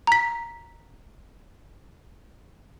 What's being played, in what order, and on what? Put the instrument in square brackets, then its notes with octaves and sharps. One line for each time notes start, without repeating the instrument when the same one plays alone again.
[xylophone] A#5 B6